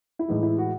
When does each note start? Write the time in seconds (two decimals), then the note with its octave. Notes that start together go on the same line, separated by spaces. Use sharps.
0.19 E4
0.28 A2 E3 G#3 D#4
0.43 E4
0.58 F#4